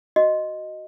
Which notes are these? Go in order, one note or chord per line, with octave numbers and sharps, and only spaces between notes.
F#4 D#5